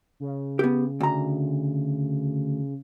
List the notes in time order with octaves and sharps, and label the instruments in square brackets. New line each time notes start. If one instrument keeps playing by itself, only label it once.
[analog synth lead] C#3
[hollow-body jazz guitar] B3 G4
D2 A#5